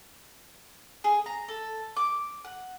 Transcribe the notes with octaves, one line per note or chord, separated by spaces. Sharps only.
G#4
A#5
A4
D6
F#5